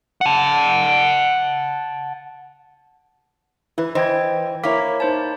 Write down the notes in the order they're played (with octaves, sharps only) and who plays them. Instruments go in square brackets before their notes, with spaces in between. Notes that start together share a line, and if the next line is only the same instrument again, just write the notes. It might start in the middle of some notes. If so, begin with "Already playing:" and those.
[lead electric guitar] F#5 A5
[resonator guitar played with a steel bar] E3 [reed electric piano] E4 B4
[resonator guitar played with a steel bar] E3 [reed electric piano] C5 [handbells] D#5 G5 G#6
[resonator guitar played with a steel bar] A#3 E4 [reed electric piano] A#4 C#5 D6 [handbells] A#5 B6
[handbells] D#4 C5 A5